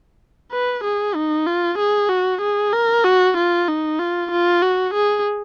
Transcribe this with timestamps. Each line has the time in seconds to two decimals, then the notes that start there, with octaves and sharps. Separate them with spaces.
0.52 B4
0.84 G#4
1.15 D#4
1.47 F4
1.78 G#4
2.09 F#4
2.42 G#4
2.73 A#4
3.04 F#4
3.37 F4
3.68 D#4
3.99 F4
4.31 F4
4.62 F#4
4.94 G#4